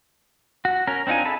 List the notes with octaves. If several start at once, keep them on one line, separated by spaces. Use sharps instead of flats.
F#4
C#4 A#4
C4 D4 D#4 F4 G#5
E4 G#4 A4 A5 B5